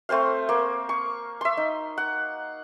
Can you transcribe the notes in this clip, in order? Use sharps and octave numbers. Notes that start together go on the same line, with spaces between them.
A3 C4 C5 F5
A#3
C#6
E5 C6
D#4
F#5